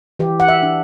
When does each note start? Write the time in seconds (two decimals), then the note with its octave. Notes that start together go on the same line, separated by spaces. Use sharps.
0.19 E3 G4
0.40 F#5
0.48 E5
0.63 D4